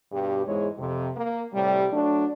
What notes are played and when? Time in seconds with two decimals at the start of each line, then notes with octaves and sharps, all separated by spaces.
0.12 G2 B2 G4
0.46 E2 G#2 G#3 E4 C#5
0.78 F2 C3
1.16 A#3
1.53 A2 C3 G3
1.91 F#3 A3 D4